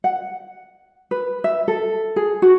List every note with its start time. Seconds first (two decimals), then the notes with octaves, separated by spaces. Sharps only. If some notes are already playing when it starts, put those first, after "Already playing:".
0.04 F#5
1.11 B4
1.44 E5
1.68 A4
2.16 G#4
2.42 F#4